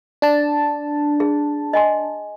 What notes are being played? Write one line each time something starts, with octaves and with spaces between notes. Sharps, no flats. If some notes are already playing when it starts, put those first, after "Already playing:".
D4 A5
G#4
D#5 G#5 C6